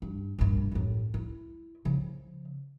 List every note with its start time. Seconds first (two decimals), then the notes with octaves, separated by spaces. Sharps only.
0.02 G2
0.39 A#1 G2
0.72 A1 F#2
1.14 E4
1.85 C#3 F3